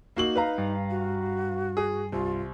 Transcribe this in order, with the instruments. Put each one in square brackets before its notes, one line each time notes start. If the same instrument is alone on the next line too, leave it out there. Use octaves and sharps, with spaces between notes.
[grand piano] A#3 F#4 F#7 [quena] D#4
[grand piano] B4 F5 A#5
[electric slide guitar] G2
[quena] F#4
[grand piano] G#4
[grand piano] C2 [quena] F4